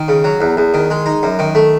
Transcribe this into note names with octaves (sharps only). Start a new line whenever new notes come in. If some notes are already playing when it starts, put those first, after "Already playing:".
Already playing: D#3
C#3
F#3
E2
E2
D#3
G#3
D#4
F#2
D#3
A3